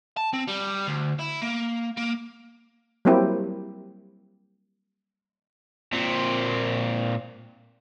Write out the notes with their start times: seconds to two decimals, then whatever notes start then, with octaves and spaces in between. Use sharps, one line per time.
0.17 A5
0.34 C4
0.48 G3
0.87 D2
1.20 E4
1.42 A#3
1.97 A#3
3.05 F#3 G3 A#3 C4 E4 G4
5.93 A#2 C4